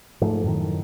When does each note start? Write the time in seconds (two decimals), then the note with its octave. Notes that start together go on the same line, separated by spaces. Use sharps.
0.21 G#2 F3 A3
0.44 F#2 A2 D#3